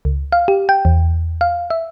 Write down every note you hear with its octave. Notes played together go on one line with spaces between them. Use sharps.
C#2
F5
G4
G5
E2
F5
E5